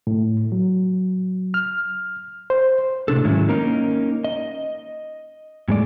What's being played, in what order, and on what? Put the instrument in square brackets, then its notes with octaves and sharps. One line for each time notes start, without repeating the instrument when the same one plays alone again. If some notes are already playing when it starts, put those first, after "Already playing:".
[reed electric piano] A2
F#3
F6
C5
[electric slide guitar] A2 C3 D4 A4
G#2 D#3 F#3 G#3 C#4 E4
A#3 C#4 D#4 A#4
D#5
A2 G#3 D5